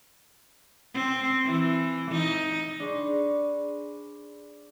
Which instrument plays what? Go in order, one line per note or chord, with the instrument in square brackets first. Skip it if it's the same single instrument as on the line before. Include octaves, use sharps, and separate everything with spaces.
[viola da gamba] C4
E3
D#4
[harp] D4 G#4 C5 B5 C#6